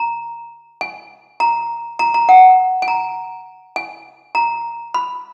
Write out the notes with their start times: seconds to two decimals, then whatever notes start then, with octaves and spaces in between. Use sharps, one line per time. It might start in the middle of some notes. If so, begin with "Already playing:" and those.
Already playing: A#5
0.81 G#5
1.40 A#5
1.99 A#5
2.14 A#5
2.29 F#5
2.82 G#5
2.88 A#5
3.76 G#5
4.35 A#5
4.94 B5